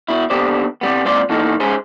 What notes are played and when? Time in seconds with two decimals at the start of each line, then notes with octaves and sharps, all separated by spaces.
0.08 B2 E4
0.30 D#2 D3 B3 G4 C5 D5
0.81 C3 G3 B3
1.05 C#2 A#2 C4 F4 D5 C6
1.29 B2 E3 A#3 D#4 A4
1.60 G#3 C#4 G#4 C5